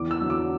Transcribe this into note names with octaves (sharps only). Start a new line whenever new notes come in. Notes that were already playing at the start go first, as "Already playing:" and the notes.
Already playing: E2 D6
E6
D3 F#3
D6